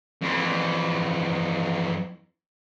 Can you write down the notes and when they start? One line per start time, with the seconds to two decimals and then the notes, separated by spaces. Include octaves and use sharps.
0.21 F2 E3